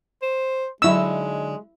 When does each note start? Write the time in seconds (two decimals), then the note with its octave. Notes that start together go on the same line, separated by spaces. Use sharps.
0.22 C5
0.82 D3 F#3 G#3 D#4 E4 E6